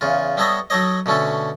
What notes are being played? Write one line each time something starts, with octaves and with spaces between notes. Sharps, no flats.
E2 C#3 F4
G3 B3 A4 C#5 D#5 E5
F#3 D#4 A4 C#5 D#5
B2 D3 A3 C#4 A4